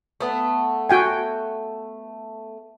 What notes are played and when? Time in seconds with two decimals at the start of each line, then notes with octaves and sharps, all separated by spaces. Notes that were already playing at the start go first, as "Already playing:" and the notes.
0.21 A3 B3 F#5
0.89 F#4 G5 G#5